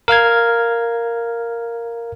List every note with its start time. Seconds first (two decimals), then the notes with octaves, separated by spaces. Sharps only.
0.08 A#4 F5 F6 G#6